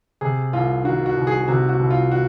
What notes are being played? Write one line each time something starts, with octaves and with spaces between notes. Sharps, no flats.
C3 G#4
C2 F4
D#3 F#4
F#4
C2
G#4
C3 F#4
F#4
C2
F4
F#4